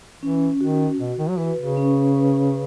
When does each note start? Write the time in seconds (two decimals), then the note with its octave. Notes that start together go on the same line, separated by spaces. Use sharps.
0.23 E3 C#4
0.61 D#3 F#4
1.00 B2 F#4
1.18 D#3
1.29 F#3
1.38 E3 B4
1.58 C#3
1.77 C#4
2.16 B4